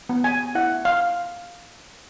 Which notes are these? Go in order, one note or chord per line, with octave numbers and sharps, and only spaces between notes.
B3
G#5
E4 F#5
F5